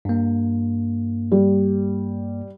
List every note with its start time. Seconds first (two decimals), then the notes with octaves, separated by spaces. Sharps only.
0.05 G2 A#3
1.32 G3